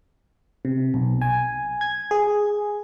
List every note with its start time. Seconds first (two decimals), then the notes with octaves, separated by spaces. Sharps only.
0.65 C3
0.94 B1
1.21 G#5
1.81 G#6
2.11 G#4